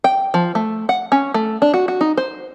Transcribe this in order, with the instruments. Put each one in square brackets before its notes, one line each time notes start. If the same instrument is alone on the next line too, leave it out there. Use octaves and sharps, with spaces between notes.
[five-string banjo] G5
F3
A3
F#5
C#4
A3
D4
F#4
F#4
D#4
C5